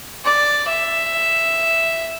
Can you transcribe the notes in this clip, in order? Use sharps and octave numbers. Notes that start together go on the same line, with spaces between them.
D5
E5